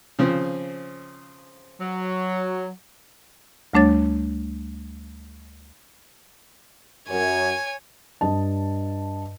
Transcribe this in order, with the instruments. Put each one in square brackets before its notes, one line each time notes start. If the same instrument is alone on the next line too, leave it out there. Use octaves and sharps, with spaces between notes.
[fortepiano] C#3 F3 C4
[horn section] F#3
[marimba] D2 G3 A3 D4 C#5 A6
[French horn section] F#2 [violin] C#5 G#5
[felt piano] G2 D#5 A5